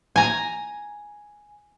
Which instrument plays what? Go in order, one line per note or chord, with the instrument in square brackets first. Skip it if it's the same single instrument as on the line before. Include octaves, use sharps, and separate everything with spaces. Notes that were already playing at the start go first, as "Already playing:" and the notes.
[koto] G#5 A#5